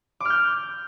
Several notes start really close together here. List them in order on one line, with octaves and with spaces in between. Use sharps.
D6 F6 G6